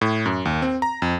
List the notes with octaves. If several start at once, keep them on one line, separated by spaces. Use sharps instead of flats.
A2
F#2
D#2
C4
A#5
F2